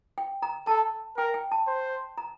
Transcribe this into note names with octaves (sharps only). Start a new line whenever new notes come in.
G5
A#5
A4 A5
A#4 G5
G5
A5
C5
A#5